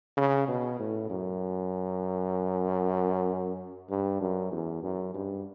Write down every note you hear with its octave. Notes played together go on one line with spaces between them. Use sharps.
C#3
B2
A2
F#2
G2
F#2
E2
F#2
G2